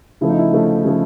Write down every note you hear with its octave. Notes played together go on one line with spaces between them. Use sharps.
C#3 F3 A3 E4
D#4
E4
C#3 F3 A3
C#3 F3 A3